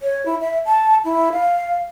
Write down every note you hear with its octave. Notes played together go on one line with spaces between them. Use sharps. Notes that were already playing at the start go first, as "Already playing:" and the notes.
C#5
E4
E5
A5
E4
F5